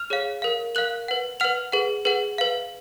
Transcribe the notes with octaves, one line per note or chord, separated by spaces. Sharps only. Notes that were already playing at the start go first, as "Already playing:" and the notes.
Already playing: F6 F7
G#4 C#5 F5
A#4 F5
A#4 F5 F#6 F#7
B4 F#5
B4 F#5 F6 F7
G#4 B4 F#5
G#4 B4 F#5
B4 F5